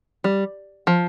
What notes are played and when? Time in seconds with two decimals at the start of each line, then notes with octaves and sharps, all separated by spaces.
0.24 G3
0.87 F3